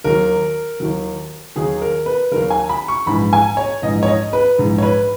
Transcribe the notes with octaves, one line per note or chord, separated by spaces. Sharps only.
D#2 D#3 F#3 A#4
D#2 D#3 F#3
D#2 D#3 F#3 G#4
A#4
B4
D#2 D#3 F#3 A#4
G#5
B5
C#6
A#1 G#2 E3 B5
G#5
C#5
A#1 G#2 E3 D#5
C#5
D#5
B4
A#1 G#2 E3
C#5
B4